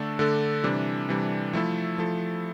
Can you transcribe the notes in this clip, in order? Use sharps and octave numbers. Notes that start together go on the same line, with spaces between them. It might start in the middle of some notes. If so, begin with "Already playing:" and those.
Already playing: D3 A3 D4 A4
D3 A3 D4 A4
C3 E3 G3 D4
C3 E3 G3 D4
F3 A3 E4 A4
F3 A3 E4 A4